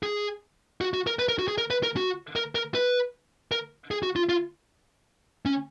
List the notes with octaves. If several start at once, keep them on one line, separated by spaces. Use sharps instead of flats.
G#4
F#4
F#4
A#4
B4
A#4
F#4
G#4
A#4
B4
A#4
F#4
A#4
A#4
B4
A#4
G#4
F#4
F4
F4
C#4